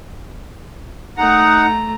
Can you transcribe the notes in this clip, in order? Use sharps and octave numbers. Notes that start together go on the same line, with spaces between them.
A3 D#4 F#5 A#5